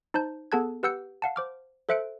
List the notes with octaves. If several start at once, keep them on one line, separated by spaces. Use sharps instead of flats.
D#4 C5 A5 G6
B3 G#4 A4 A5 F#6 G#6
G4 B4 F#5 E6 G6 C#7
F5 F#5 A5
C5 D6 F6
A4 C5 E5 F#6 C#7 D7